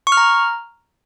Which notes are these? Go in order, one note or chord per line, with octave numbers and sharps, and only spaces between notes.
C#6
F6
A#5